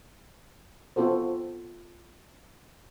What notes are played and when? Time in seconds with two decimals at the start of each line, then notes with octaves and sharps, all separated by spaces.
0.96 B3 C4 F4 F#4 A4 C5